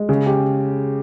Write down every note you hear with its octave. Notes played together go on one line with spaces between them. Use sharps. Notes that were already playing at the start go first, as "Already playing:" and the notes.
Already playing: G#3
C#3
G4